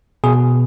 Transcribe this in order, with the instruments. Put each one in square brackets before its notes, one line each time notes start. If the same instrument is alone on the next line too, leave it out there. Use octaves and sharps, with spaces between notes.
[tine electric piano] B2 G#4